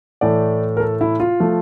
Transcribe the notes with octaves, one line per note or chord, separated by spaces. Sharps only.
A2 E3 A3 D5
A#4
A4
E4
F4
F3 A3